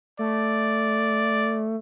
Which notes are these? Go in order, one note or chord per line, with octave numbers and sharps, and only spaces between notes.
A3 D5